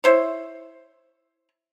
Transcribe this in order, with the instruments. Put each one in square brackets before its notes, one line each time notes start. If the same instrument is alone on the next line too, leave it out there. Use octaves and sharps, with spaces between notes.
[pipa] E4 C5 C#5